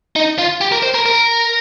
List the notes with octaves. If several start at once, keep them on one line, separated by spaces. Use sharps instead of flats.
D#4
F4
G4
A#4
C5
A#4
A#4